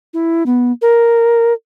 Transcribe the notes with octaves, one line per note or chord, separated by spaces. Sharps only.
E4
B3
A#4